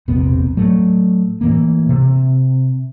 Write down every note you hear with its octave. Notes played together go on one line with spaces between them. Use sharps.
E1 A#1 C3 B3
A2 F#3 A3
A2 E3 A#3
C3